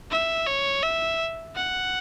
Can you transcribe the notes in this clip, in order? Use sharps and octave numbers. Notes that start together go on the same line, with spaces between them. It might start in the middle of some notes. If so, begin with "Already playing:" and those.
E5
C#5
E5
F#5